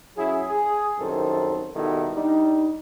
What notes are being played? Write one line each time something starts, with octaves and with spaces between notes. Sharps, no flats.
F#3 C#4 E4 G#4
G#4
C2 F#2 D#3 A4 C5
B2 D#3 G3 E4 A4
G3 D4 D#4